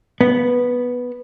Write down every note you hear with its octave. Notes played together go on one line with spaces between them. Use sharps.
B3